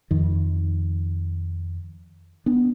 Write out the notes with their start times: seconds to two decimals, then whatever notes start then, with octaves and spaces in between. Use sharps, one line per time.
0.11 F2 D#3
2.46 B3 D4